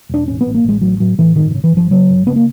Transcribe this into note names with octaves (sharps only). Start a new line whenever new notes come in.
E1 D4
A1 C#4
B3
A1
A#3
A1 G#3
A2 F#3
A2 F#3
A2 E3
G1 D#3
D#3
C#3
E3
G1 F3
C#3 F#3
G1
C#3 B3
A#3